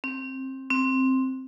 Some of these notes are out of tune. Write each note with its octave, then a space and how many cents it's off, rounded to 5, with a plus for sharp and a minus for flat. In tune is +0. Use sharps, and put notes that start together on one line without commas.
C4 +20
C4 +5